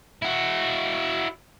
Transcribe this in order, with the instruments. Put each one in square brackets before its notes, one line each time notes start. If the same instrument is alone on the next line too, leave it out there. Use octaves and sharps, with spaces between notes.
[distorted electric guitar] E4 F#4